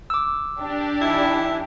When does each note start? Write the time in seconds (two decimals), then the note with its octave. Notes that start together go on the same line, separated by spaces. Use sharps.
0.10 D6 E6
0.60 D4 G4
1.02 E3 D#4 E4